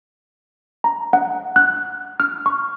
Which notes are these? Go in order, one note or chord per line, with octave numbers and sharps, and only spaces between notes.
A#5
F#5
F#6
F6
C#6